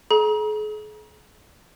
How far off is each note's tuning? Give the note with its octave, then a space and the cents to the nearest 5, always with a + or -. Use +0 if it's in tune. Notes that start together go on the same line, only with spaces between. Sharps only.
G#4 +45 A#5 +35